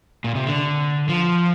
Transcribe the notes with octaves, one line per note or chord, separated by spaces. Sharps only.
A#2
C3
D3
F3